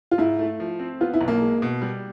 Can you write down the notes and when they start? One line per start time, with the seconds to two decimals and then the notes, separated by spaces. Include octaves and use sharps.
0.11 F4
0.18 G#2 E4
0.39 A3
0.60 F3
0.79 C4
1.01 B3 F4
1.13 E4
1.21 B1
1.28 A#3
1.41 G#3
1.62 B2
1.82 G3